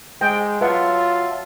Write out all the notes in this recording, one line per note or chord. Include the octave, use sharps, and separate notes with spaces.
G#3 G5
F#3 F4 B4 E5 F#5 A5